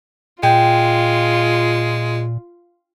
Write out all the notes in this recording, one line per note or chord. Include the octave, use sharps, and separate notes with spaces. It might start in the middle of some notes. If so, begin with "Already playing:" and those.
A#2 G#3 F4 G5